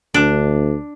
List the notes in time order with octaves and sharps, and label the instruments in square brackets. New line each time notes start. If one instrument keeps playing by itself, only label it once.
[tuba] D2 [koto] D4